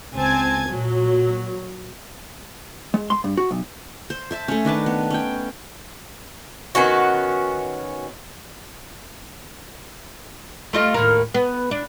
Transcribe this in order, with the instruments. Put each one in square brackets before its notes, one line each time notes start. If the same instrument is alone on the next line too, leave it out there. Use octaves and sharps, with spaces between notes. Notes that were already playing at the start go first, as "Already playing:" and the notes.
[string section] C#2 C4 G#5 A5 G#6
A#2 F#3
[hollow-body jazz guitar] G#3
C6
G2
F#4
B1
[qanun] C5
C5 E5 A5
A3 C#4
D#3 D4 B4 A5
B3
C#4 G5
[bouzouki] D#3 B3 C#4 F#4
[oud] A3 F4 D#5
D#2 A2 A#4
B3
D4